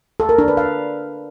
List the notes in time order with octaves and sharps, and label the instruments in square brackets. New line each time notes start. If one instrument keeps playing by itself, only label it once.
[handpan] A4
A#4
D4
B4
F5